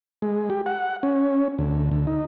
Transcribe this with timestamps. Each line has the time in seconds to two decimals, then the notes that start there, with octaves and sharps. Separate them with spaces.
0.22 G#3
0.50 G4
0.66 F#5
1.03 C#4
1.59 D2
1.91 D2
2.07 D#4